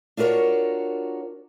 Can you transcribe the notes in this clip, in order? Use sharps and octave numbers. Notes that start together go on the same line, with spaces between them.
D4 F4 F#4 A#4 C#5